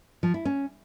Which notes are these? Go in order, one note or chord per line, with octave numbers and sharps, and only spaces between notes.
F3
E4
C#4